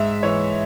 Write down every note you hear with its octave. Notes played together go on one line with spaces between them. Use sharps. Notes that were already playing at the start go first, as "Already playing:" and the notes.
Already playing: G#2 E5
E3 C#5